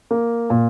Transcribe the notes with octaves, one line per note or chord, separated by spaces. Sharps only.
A#3
A#2